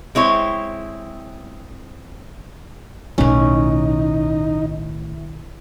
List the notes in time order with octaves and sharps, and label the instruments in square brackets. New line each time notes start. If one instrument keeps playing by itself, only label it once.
[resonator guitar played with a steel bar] G#3 C4 E4 C#5
[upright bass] B1 D#3 [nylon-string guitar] A2 [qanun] C#4 [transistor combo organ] D#4